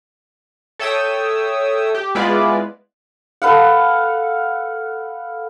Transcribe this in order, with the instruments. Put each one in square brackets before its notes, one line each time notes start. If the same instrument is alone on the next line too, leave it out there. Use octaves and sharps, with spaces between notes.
[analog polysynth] A4 C#5 E5 G5 D#6 E6
G4
G#3 B3 E4 F4 B4 D5
[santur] A4 B4 F5 F#5